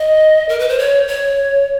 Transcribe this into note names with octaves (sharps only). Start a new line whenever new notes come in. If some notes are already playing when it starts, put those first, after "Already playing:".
Already playing: D#5
A#4
B4
C5
C#5
C#5